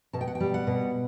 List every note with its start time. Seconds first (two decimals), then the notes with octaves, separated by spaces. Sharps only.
0.13 B2 A5
0.21 G5
0.27 F#5
0.35 G5
0.40 G3
0.54 F#5
0.67 B2